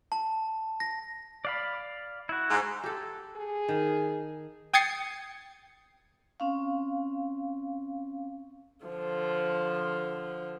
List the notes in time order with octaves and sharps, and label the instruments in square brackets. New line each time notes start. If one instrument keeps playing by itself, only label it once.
[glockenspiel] A5
A#6
[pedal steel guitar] D5 F5 B5
E4 F#4
[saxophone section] G#2
[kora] G4 A4
[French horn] G#4
[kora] D#3
[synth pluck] G5 D#6 G#6 A6 C7 C#7
[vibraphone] C4 C#4 F5
[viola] D3 F3